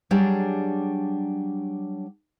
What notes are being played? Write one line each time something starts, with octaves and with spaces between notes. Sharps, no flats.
F#3 G3 D4 G4 G#4